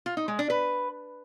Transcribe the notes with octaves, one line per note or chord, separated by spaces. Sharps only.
F4
D#4
G#3
D4
B4